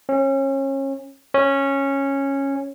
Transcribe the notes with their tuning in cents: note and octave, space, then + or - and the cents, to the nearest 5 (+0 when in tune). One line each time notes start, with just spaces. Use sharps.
C#4 -30
C#4 -10